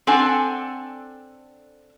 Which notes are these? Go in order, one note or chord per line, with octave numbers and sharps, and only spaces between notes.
C4 D4 A4 F#5 G#5